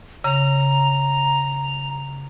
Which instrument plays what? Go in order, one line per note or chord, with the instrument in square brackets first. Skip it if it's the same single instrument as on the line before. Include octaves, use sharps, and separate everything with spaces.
[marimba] C#3 [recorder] A#5